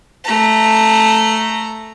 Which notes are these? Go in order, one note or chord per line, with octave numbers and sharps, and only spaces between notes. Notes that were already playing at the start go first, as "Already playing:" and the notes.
A3 A#5